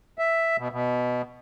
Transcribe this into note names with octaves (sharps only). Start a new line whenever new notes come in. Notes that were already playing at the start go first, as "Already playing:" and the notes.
E5
B2
B2